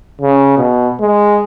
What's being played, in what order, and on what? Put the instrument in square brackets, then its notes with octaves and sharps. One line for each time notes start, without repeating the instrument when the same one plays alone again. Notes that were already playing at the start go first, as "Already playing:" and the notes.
[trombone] C#3
B2
G#3